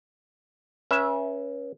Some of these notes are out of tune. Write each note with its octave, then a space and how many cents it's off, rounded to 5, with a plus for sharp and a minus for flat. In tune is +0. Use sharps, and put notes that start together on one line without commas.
C#4 +0 B4 -35 E5 +0